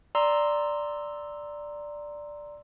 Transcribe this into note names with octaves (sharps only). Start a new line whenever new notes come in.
D5 A#5 C6 E6